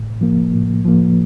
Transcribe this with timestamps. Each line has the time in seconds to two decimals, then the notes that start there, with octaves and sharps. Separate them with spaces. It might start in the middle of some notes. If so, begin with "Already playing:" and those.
Already playing: A2
0.21 F3 A#3
0.54 A2
0.85 F3 A#3